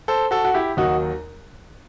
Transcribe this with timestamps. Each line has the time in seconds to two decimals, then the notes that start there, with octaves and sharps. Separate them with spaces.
0.08 A4 C5
0.31 F#4 A4
0.45 F#4
0.54 E4 G4
0.77 D#2 D#3 F#3 D#4 F#4